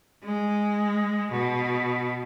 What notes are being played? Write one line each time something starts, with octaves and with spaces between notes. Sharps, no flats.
G#3
B2